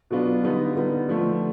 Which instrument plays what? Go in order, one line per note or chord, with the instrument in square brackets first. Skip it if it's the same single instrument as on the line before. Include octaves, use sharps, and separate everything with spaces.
[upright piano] B2 F#3 B3 D4 F4
D3 G3 B3 D#4
D3 G3 B3 D#4
D3 F3 A3